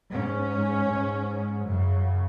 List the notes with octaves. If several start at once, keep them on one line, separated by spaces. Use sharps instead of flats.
G#2 C#4
G#2
F#2 C#3 F#3